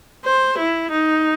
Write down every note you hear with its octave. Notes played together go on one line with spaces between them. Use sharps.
C5
E4
D#4